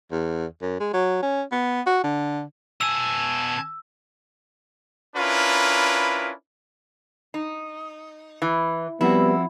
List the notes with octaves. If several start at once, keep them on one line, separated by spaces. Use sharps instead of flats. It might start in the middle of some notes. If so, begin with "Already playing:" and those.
E2
F#2
G#3
F#3
C#4
B3
F#4
D3
B2 G#5 A5 E6 G#6
C#4 D4 E4 F4 A#4 B4
D#4
E3
F3 G3 B3 C4 E4 F#4